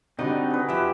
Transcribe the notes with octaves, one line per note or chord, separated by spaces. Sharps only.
D3 G3 C4 D#4 F#4 D#5 G5
G#4 B4
F2 F3 G4 E5